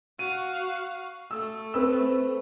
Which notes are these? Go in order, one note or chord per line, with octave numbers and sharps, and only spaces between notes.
F#4 F5 D#7
A3 E6
C4 B4 E6